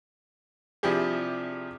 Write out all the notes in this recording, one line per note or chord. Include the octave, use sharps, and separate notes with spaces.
C3 F3 D4 E4 G4 G#4